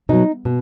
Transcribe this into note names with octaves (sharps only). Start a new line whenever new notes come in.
B2 F#3 D#4
B2